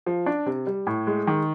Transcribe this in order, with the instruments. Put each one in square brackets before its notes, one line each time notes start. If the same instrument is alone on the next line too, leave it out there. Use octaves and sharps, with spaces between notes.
[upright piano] F3
D4
C3
G3
A2
G#3
D#3